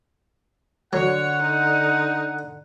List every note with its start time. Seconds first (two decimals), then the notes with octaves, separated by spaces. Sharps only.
0.93 D3 F#3 C#5 F#5
1.42 D#4